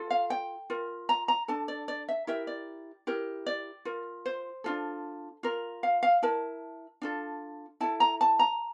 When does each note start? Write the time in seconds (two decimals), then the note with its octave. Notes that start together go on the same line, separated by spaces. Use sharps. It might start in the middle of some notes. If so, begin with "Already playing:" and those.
Already playing: F4 A4
0.11 F5
0.30 G5
0.70 F4 A#4
1.09 A#5
1.28 A#5
1.48 D4 A4 A5
1.68 D5
1.88 D5
2.09 E5
2.27 E4 G4 A#4 E5
2.47 D5
3.07 E4 G4 A#4
3.46 D5
3.85 F4 A#4
4.26 C5
4.64 D4 F4 A4
5.43 F4 A#4
5.83 F5
6.03 F5
6.22 E4 A#4 A5
7.02 D4 F4 A4
7.81 E4 A4 A5
8.00 A#5
8.21 A5
8.39 A#5